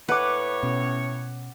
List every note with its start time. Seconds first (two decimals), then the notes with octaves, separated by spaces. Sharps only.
0.08 A2 B4 C#5 F#5 D6
0.63 B2 C#4